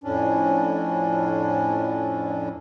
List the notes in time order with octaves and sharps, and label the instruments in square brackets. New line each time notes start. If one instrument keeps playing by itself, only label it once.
[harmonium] F2 A2 C#4 D4